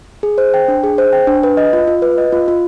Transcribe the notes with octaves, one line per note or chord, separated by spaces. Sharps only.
G#4
C5
G5
D4
G#4
C5
G5
D4
B4
D#5
F4
F4
B4
D#5
F4
F4